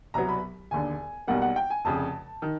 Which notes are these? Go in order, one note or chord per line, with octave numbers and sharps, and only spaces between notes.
C2 B2 F#3 B3 A#5
B5
E1 D#2 D3 G#5
B1 B2 G3 A#3 F#5
F#5
G5
G#5
F1 F2 C#3 A5
D#3